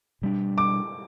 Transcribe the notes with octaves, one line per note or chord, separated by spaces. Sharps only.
B2 G3 D4
D6